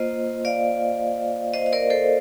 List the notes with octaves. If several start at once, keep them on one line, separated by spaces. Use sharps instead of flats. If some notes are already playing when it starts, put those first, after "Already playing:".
Already playing: A#3 F4 C5 D#5
D5 F5
C5 D#5
D#5
A#4 D5
A4 C5